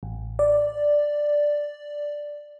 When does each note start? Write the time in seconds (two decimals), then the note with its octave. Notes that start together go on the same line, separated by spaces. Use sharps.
0.03 A1
0.39 D5